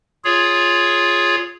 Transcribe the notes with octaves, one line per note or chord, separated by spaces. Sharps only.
F4 G#4 C#5